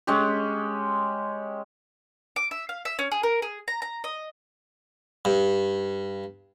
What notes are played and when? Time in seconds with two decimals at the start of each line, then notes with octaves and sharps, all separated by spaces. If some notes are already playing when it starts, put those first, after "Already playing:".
0.07 G#3 C#4 G4
2.36 D6
2.51 E5
2.69 F5
2.85 E5
2.99 C#4
3.12 G#4
3.23 A#4
3.42 G#4
3.68 A#5
3.82 A#5
4.04 D#5
5.25 G2